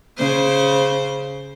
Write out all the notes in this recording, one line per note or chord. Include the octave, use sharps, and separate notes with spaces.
C#3 C5